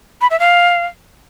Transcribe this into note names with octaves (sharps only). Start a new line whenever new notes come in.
B5
E5
F5